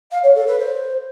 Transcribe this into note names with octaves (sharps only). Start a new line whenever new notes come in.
F5
C#5
A4
B4
C5